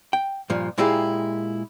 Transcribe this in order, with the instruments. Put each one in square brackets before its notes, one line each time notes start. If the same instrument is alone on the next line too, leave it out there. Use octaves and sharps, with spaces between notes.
[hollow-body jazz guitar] G5
G2 A#2 F3
A#2 G#3 E4 F4 G4 G#4